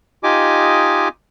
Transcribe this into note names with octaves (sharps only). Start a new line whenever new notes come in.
D#4 F4 G4 D#5 G#5 D6